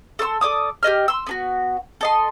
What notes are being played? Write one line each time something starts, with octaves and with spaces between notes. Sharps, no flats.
A4 C6 C#6 E6
A4 D5 D6 D#6
G4 C#5 D#5 F6
C6 E6
B3 D4 F#4
A4 D#5 C6